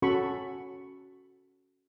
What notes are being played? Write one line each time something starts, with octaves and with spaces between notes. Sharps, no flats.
C#4 F#4 A4 B5 C#6